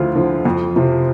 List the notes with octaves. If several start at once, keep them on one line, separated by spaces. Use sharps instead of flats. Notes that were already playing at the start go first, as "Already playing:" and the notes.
Already playing: D2 D3 F3 E4 F4
D3 F3
F2
C3 F3